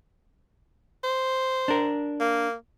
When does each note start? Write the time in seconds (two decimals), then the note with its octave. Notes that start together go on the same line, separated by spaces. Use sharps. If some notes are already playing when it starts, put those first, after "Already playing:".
1.04 C5
1.68 D4 A#4
2.20 A#3